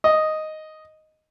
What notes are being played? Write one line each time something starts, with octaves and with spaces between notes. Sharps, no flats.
D#5